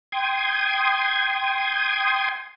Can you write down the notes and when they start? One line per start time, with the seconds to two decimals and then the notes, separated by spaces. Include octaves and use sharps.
0.12 G5 C6 D#6 G#6